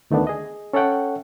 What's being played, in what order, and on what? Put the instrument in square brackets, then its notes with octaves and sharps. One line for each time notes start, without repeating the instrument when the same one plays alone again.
[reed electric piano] D2 D#3 A3 B3 D4
G#4 D#5
C#4 A4 C#5 E5 F#5 G5